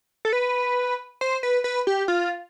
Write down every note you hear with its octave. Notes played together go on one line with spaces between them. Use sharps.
A4
B4
C5
B4
B4
G4
F4